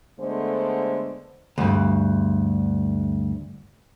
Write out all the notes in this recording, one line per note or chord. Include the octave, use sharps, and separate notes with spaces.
D3 G#3 A3 B3 C5
D2 G2